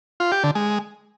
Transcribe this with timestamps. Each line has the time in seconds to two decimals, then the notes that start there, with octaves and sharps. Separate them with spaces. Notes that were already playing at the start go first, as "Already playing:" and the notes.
0.20 F4
0.32 G4
0.44 D3
0.55 G#3